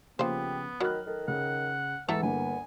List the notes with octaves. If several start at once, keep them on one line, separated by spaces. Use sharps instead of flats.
C#3 F3 A#3 B3 G4 C5
D#3 F#3 B5 F6 F#6
D#3 A4
C#3 F#5
E2 G#2 E3 A3 B3 A4 A#5
G1 A#3 G#5